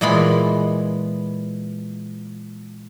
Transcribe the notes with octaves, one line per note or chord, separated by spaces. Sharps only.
A#2 E3 G#3 B3 B5 C6